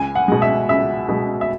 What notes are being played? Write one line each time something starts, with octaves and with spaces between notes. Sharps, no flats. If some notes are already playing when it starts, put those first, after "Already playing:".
Already playing: C#2 G#5
F#5
B2 G#3
E5
C#2 E5
B2 G#3
E5